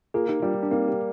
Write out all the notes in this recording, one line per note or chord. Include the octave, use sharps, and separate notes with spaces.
A#3 F4 G#4
D#4 G4
G3 D4 F4
D4
A#3 C4 D#4
G4